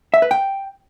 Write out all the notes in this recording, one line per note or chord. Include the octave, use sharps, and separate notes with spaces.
E5
B4
G5